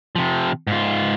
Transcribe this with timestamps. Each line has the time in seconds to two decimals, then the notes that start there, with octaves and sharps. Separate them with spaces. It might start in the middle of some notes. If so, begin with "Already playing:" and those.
0.16 C3 F3
0.67 G#2 F4